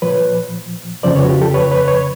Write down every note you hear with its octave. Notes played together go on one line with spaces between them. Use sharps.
A#2 F3 B4 C#5
F2 C#3 F3 C5 D5
B4 C#5
F#4
F4 G4
G4 A4
B4 C#5
B4 C#5
B4 C#5